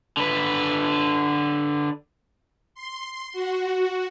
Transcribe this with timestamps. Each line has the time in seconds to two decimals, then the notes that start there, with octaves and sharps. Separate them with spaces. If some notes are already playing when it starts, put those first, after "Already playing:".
0.17 D3 B4
2.74 C6
3.33 F#4